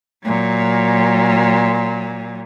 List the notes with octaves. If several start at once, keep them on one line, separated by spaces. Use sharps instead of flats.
A#2 F#3